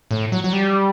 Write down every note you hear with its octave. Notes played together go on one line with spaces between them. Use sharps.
A2
F#3
F#3
G3